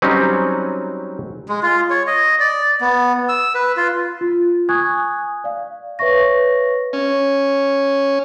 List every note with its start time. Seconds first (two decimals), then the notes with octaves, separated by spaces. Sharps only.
0.02 F#3 G3 C4 C#4 D#4
1.49 G#3
1.63 F4
1.90 C#5
2.07 D#5
2.40 D5
2.81 B3
3.29 E6
3.55 B4
3.77 F4
4.21 F4
4.69 G#5 C#6 D#6 F#6 G#6
5.44 D5 F5
5.99 B4 C#5 E5 C#6 A#6
6.93 C#4